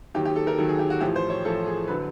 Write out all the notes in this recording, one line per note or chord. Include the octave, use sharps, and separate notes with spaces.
D#2 D#3 F#3 G4
G4
A4
A#4
D#2 D#3 F#3 A4
G#4
G4
F#4
A1 A2 F3 G4
C5
C#5
A1 A2 F3 A4
G#4
D3 F#3 B4